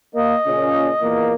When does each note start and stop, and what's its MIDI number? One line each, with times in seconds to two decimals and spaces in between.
0.14 0.35 58
0.14 1.33 75
0.47 0.91 46
0.47 0.91 49
0.47 0.91 61
1.01 1.35 40
1.01 1.35 46
1.01 1.35 58